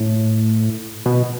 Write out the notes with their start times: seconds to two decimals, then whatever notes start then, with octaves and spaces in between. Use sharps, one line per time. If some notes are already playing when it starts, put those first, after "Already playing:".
Already playing: A2
1.06 B2